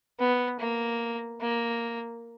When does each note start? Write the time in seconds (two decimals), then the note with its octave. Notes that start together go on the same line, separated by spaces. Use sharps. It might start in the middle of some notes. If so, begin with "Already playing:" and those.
0.19 B3
0.59 A#3
1.41 A#3